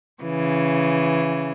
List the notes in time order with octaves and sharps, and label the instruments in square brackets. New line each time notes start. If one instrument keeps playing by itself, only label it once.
[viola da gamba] C#3 E3